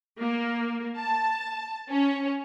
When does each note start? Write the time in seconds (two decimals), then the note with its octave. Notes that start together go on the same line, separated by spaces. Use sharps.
0.19 A#3
0.97 A5
1.89 C#4